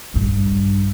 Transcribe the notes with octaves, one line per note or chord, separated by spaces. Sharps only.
A#1 G2